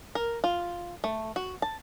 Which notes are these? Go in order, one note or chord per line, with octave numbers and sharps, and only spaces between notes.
A#4
F4
A3
F#4
A5